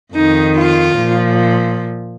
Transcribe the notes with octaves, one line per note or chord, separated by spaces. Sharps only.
F2 D#3 D#4
F4
A#2 F3